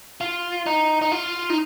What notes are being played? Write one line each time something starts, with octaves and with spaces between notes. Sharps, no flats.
F4
D#4
D#4
F4
D#4